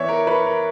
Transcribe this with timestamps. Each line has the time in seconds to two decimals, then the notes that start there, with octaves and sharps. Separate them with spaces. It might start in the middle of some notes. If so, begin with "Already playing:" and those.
Already playing: E3 B3 C#5 D5 E5
0.09 A#4
0.27 B4
0.46 A#4